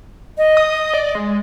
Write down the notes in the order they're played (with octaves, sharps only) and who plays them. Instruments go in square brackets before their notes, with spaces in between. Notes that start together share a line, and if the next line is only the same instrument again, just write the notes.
[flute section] D#5
[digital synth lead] D#6
D5
G#3